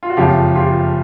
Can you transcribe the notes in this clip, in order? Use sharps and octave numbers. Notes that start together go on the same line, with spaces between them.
F4
F#4
F#1 F2 C#3 F3 F4 G4
F4 G4